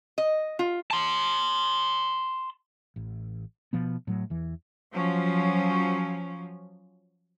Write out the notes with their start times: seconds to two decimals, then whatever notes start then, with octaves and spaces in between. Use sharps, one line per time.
0.18 D#5
0.59 F4
0.91 A5 C6
2.96 A1
3.73 B2 F3 B3
4.07 A2 F#3
4.30 E2 E3
4.92 F3 F#3 C#4